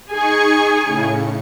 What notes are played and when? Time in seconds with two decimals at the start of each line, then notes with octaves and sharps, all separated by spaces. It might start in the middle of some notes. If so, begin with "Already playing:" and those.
0.13 D#4 G#4 G#5 C#6 C#7
0.81 A2 C#3